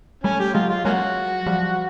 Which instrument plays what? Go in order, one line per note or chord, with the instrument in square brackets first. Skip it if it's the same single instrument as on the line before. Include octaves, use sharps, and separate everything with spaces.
[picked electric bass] G3 A3 [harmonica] C#4
[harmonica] G4
[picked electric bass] F#3 G#3 [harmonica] F4
[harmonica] F4
[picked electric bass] F#3 G#3 [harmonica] A#3 C#4 F#4
[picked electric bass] F3 G3